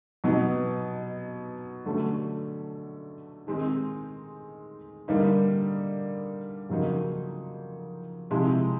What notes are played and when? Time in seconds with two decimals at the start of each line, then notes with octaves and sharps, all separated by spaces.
0.24 B2 F#3 B3 D#4
1.86 D3 F#3 A3 C#4
3.47 D#3 G#3 C4 D#4
5.08 D3 G3 A#3 D#4
6.70 F2 C#3 F#3 A#3 D#4
8.30 C3 F3 G#3 C4 E4